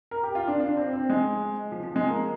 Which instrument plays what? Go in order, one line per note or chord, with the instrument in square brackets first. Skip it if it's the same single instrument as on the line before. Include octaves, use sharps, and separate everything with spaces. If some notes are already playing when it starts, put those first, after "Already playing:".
[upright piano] A#4
G4
F4
D4
D4
C4
C4
G#3
F3
F3
G#3
A#3